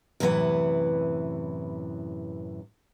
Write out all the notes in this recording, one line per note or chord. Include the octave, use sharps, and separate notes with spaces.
F#2 A2 C3 E3 B4 F#5